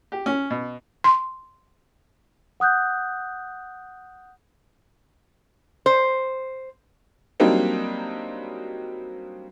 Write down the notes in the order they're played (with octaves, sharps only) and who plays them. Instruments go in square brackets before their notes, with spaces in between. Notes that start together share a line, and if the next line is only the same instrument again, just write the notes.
[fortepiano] G4
C#4
B2
[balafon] C6
[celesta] F#5 D#6 F#6 G6
[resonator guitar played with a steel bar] C5
[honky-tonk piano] F#3 G3 A#3 C4 D4 D#4